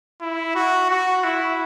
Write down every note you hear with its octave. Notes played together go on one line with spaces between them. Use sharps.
E4
F#4
F#4
E4